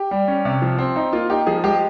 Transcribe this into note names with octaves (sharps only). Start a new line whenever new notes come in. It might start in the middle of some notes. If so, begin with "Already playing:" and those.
Already playing: G4
G3
C#4
C3
F3
C4
D#4
A#3 F4
D#4 G4
F3 G#4
G#3 G4